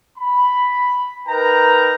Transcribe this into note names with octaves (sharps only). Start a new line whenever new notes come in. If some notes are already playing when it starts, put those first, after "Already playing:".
B5
D#4 A#4 B4 G5 A#5